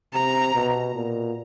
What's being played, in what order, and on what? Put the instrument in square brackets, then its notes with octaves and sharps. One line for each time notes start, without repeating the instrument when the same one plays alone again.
[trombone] C3 [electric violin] A#5
[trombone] B2
A#2